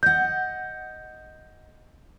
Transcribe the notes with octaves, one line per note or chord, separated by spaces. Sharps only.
D#5 F#5 G6